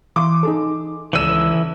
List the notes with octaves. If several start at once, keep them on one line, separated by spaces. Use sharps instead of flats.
E3 F5 C6 D6
D#4 G#4 A4
D#1 C#2 E3 D5 E6 D#7 E7